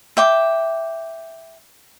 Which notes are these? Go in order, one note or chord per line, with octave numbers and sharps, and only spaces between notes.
E5 G5 D6